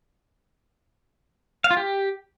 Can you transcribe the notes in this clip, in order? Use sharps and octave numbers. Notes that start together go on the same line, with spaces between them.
F5
F4
G4